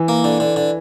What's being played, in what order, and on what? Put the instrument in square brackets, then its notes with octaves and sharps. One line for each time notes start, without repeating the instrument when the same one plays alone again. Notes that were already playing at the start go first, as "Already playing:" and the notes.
Already playing: [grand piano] E3
[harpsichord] A#3
D3
D3
D3